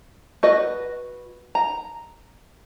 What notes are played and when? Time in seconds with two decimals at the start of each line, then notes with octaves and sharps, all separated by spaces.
0.43 F#4 B4 D#5
1.55 A#5